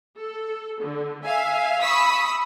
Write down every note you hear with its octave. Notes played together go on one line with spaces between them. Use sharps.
A4
D3
E5 F5 G#5
B5 C#6 D#6 E6 B6